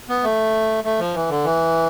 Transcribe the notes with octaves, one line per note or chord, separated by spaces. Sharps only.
B3
A3
A3
F3
E3
D3
E3